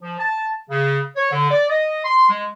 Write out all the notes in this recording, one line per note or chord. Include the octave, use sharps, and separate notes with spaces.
F3
A5
C#3
C#5
D3
D5
D#5
C6
G#3